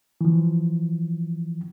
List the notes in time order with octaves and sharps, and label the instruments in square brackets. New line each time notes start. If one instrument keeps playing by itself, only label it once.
[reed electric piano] E3 F3